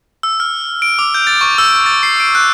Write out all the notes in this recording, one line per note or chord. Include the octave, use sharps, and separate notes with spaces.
E6
F6
D7
D6
G6
A6
C#6
E6
A6
C7
D7
F#6